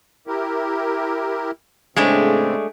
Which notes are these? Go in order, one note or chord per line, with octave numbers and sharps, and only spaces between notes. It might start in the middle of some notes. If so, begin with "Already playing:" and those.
E4 G4 A#4
A2 C#3 G#3 A3 C4 D4